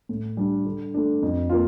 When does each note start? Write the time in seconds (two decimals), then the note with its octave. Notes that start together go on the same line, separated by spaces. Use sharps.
0.09 A2
0.37 G3 D4
0.65 D3
0.94 A3 D4
1.22 F2
1.50 A#3 F4